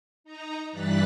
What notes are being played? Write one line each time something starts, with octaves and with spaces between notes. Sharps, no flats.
D#4 A#5
G2 E3 G3 F#6 A6 B6